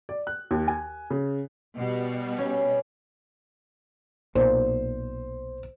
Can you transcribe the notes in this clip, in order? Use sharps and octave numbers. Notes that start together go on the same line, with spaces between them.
D5
F#6
D#2
G#5
C#3
B2 G3
C#4
B1 A#2 C5